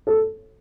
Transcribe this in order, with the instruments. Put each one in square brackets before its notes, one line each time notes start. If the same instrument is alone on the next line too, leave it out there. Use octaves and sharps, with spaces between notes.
[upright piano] A4